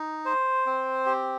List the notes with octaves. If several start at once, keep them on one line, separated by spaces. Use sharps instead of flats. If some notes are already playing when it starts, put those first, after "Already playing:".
Already playing: D#4
C5
C4
G4